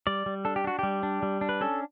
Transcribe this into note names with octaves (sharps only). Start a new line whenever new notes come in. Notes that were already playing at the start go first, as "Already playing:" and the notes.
G3 D5
G3
D4 A4
G4
D4 F#4
G3 G4
D4
G3
D4
B4
C#4 A4